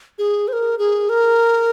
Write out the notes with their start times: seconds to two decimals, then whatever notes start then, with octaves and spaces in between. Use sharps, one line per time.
0.18 G#4
0.48 C5
0.53 A#4
0.79 G#4
1.09 A#4